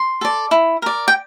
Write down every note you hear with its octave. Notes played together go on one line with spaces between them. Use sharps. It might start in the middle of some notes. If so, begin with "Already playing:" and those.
Already playing: C6
A4 D5
E4
A#4 D5
G5